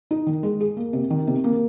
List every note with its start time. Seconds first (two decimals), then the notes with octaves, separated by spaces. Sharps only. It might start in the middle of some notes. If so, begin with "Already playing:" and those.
0.11 D#4
0.27 D#3
0.43 G#3
0.60 G#4
0.77 A#3
0.93 C3
1.10 D#3
1.27 C3
1.44 A#3